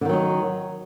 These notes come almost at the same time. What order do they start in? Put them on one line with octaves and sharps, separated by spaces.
D3 D#3 F#3 D#4